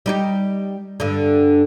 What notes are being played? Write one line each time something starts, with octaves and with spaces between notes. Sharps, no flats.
G3 D#4 G4
G2 D3